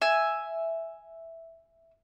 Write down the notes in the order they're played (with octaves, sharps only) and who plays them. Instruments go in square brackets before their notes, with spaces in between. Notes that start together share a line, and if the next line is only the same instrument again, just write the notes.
[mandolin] E5 G#5